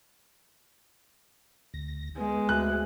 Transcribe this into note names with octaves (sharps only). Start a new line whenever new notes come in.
D2 A#6
G#3 B3
D2 F#6